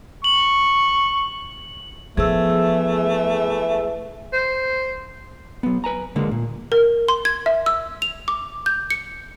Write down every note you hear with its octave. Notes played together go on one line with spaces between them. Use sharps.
C#6 F#7
E3 F3 A3 B3 G#4 E6
C5
F#3 B3
B4 G#5 A#5
C#2 D3 G#3 A#3
A#2
A#4
C6
G#6
E5
E6
F7
D6
G6
C#7